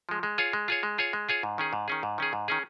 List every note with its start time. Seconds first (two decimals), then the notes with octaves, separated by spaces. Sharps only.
0.09 F3 G#3
0.23 G#3
0.38 F4 G#4 C#5
0.53 G#3
0.68 F4 G#4 C#5
0.83 G#3
0.98 F4 G#4 C#5
1.13 G#3
1.29 F4 G#4 C#5
1.43 G#2
1.58 D#3 C#4 G#4
1.73 G#2
1.88 D#3 C#4 G#4
2.03 G#2
2.18 D#3 C#4 G#4
2.33 G#2
2.48 D#3 C#4 G#4